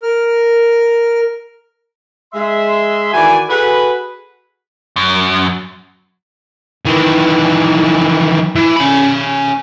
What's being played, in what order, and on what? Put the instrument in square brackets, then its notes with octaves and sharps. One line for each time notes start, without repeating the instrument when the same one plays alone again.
[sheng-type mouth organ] A#4 F6
[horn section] G#3 E5 C6
D#3 E3 F#4 D5 G#5
F#4 G#4 A4 B4
[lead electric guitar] F#2
[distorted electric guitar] D#3 E3
E3
C#4 B5